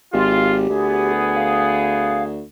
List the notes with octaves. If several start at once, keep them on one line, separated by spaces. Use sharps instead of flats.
G#1 F4 G4
D2 B3 G#4
F5